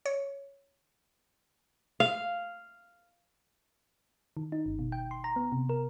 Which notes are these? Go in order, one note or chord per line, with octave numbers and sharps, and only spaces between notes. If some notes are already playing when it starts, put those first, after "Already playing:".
C#5
F5
D#3
D#4
G1
B2
G5
C6
A#5
B3
C3
A#4